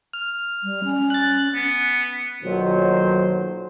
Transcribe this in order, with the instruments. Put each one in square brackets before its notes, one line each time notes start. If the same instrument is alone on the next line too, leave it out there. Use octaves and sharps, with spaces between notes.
[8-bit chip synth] F6
[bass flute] G3
C#4
[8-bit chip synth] F#6 A6
[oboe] B3
[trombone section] B1 A#2 D#3 F#3 C5